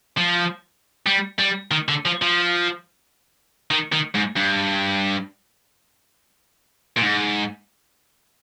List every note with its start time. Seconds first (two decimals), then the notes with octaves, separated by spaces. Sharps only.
0.17 F3
1.06 G3
1.39 G3
1.71 D#3
1.89 D3
2.06 F3
2.22 F3
3.71 D#3
3.92 D#3
4.15 G#2
4.37 G2
6.97 A#2
7.02 G#2